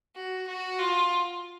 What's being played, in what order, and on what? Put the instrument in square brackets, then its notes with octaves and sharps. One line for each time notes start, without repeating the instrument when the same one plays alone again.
[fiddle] F#4
F#4
F4